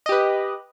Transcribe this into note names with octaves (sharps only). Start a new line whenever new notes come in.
G4 B4 D#5